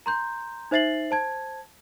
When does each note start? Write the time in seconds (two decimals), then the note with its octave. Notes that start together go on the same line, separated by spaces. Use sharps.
0.06 A#5 C6 G6
0.71 D#4 C5 E5 A6 C7 F#7
1.11 C5 A5 G#6